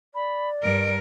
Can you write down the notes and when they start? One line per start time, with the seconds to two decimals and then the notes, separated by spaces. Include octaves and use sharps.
0.15 D5 B5
0.63 G2 A#4 D7